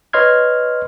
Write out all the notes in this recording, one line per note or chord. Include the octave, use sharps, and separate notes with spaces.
B4 C#5 D#5 C6 F6 G#6